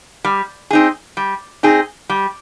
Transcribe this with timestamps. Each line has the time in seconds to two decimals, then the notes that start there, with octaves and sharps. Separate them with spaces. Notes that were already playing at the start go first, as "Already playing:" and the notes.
0.25 G3
0.70 C4 D#4 G#4
1.17 G3
1.63 C4 D#4 G#4
2.09 G3